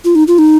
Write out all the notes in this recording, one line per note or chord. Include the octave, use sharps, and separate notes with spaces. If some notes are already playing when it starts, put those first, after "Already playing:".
F4
D#4
F4
D#4